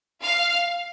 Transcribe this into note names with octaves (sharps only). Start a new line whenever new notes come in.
F5